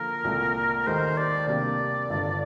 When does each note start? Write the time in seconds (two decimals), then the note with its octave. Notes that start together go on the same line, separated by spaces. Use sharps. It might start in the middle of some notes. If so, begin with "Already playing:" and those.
Already playing: D3 F3 A#3 A#4
0.25 C2 A#2 A3
0.87 D#2 D#3 A3 D#4 G4 C5
1.17 D5
1.48 C3 G3 A#3 D4 G4 D5
2.10 G1 G2 D3